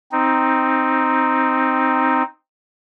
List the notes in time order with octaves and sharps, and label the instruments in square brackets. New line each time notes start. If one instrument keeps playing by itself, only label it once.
[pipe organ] C4 D#4